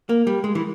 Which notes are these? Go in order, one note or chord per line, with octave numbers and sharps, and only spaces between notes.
A#3
G3
G#3
E3